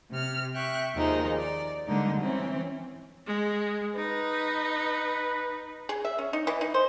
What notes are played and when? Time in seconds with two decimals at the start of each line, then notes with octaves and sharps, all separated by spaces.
0.11 C3 F6
0.54 E5 G5 C#6 F#6
0.94 D#2 D#3 F3 G#3 D#4
1.37 D5
1.87 D3 G3 G#3 A#3 D4 D#4
2.19 E3 C4 C#4
3.27 G#3
3.96 D#4 B4
5.89 G#4
6.05 E5
6.19 C#4
6.33 D#4
6.47 E3
6.61 D#4
6.74 C5